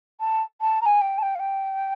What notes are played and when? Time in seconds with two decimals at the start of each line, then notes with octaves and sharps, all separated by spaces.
0.20 A5
0.61 A5
0.81 A#5
0.86 G#5
1.01 G5
1.18 A5
1.22 G5
1.35 F5
1.39 G5